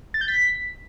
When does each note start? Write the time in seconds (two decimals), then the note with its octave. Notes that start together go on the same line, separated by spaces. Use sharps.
0.14 A6
0.21 G6
0.28 B6